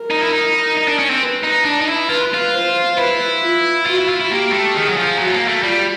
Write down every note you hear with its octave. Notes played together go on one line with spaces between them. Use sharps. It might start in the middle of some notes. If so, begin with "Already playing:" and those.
Already playing: A#4
D#4
E4
D#4
D#4
D4
C#4
C4
B4
D#4
D4
D#4
E4
F4 B4
F4
C5
E4 B4
F4
F4 F#4
E4
F4
E4
A#3 G4
A3
D#3 G#4
F#3
F3
F#3 F#4
A3
A#3
A3
G3 F4